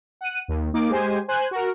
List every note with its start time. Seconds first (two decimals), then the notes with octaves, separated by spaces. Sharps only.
0.21 F#5 D#7
0.48 D#2
0.73 A#3 D#4 D6
0.90 G#3 G4 C5 G#5
1.28 C5 G#5 F#6
1.51 F#4 A#4